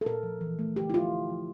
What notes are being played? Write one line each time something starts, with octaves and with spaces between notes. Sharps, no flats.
A4
A#2 A#4
F3
E3
A3
D3 G4
E4
F3 F4
D3
F3